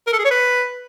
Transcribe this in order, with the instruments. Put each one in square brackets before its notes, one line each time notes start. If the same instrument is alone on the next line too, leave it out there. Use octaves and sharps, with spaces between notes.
[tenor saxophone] A#4
A4
G#4
C#5
B4